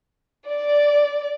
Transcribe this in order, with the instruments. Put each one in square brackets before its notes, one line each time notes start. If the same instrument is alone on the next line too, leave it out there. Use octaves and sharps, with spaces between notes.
[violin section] D5